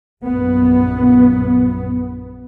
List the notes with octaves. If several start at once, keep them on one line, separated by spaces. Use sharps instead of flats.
A#1 F#2 B3